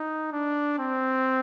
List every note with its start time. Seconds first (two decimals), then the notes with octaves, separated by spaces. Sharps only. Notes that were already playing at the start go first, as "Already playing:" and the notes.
Already playing: D#4
0.32 D4
0.79 C4